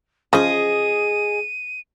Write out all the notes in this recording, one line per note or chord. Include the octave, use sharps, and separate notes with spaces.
C#3 F3 G#4 D#5 D#7